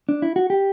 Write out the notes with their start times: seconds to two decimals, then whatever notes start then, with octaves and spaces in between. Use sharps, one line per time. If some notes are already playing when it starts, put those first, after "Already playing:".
0.09 D4
0.22 E4
0.36 F#4
0.50 G4